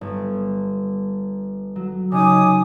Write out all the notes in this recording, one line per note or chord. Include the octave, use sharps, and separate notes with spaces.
G1
F#3
C#3 D#4 G#5 D6 D#6